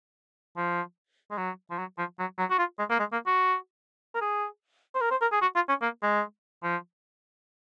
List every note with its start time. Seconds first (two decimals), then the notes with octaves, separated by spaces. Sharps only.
0.57 F3
1.31 G#3
1.38 F#3
1.70 F3
1.78 F#3
1.98 F3
2.19 F#3
2.38 F#3
2.50 F#4
2.59 F4
2.79 G#3
2.90 A#3
2.99 G#3
3.12 A#3
3.26 F#4
4.15 A#4
4.21 G#4
4.95 C5
5.01 A#4
5.11 C5
5.21 A#4
5.32 G#4
5.42 F#4
5.55 F4
5.68 C#4
5.82 A#3
6.02 G#3
6.64 F3